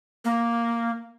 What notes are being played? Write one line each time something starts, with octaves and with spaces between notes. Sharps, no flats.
A#3